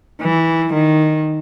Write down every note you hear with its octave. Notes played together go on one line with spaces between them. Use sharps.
E3
D#3